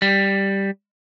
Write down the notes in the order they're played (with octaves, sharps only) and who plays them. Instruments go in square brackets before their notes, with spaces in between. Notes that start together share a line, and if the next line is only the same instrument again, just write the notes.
[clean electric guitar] G3